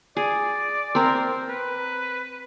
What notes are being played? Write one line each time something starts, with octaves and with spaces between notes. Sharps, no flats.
G#4 D5
C4 A#4
B4